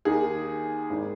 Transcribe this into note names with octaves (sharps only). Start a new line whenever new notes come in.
D#2 D#3 G#4
G#1 D#3